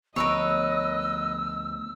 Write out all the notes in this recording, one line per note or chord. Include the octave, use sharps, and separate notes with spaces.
D2 F3 B3 A#4 B4 C#5 D#5 E6